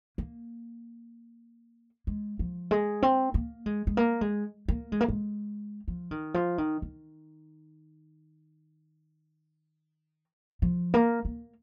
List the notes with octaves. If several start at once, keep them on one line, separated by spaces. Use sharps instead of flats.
A#3
G#3
F3
G#3
C4
A#3
G#3
G#3
A#3
G#3
A#3
G#3
A#3
G#3
F3
D#3
F3
D#3
D#3
F3
A#3
A#3